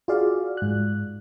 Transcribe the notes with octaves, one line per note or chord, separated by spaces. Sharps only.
F4 F#4 G#4 D5 F5
G#2 F#6